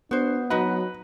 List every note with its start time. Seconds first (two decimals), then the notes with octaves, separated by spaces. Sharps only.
0.11 B3 D4 F#4 C5
0.50 F#3 D#4 F#4 B4 D#5